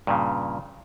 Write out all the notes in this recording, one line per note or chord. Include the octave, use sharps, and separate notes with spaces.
G2 A#2 C#3